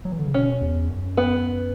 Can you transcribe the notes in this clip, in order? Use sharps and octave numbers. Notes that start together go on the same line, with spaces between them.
F#3
E3
D3
C#3
B2 C#4
E2
F#2
B3